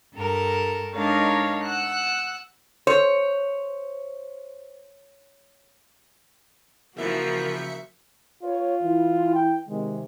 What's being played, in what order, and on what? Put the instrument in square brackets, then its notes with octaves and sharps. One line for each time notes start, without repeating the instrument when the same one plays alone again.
[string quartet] G2 A4 A#4
G#3 D4 D#4 A#4 C#5 F5
F#5 E6 F#6
[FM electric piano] C5 [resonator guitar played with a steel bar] C#5
[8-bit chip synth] C#3 E5 C#7 [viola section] E3 F3 A#4 [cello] A#3 F#4
[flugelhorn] F4 [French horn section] B4 C#5
[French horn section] E3 E4
[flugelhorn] G5
[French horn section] C3 D#3 [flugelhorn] G#3